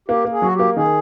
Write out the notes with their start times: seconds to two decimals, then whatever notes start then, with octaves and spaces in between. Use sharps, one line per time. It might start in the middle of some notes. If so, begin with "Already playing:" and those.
0.08 A#3 G4
0.25 A#3
0.31 G#4
0.42 F#3 F#4
0.54 G4
0.59 A#3
0.76 D#3 G#4